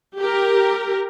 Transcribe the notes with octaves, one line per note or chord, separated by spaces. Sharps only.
G4 A#4